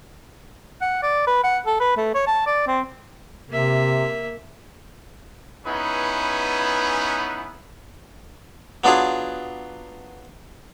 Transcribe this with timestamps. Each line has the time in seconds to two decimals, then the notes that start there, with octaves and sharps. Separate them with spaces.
0.81 F#5
1.02 D5
1.27 B4
1.44 F#5
1.66 A4
1.80 B4
1.97 A3
2.15 C#5
2.27 A5
2.46 D5
2.67 C4
3.50 C3 A#3 E5
5.65 B3 C#4 D#4 E4 G#4 B4
8.84 F#3 B3 D4 F4 G#4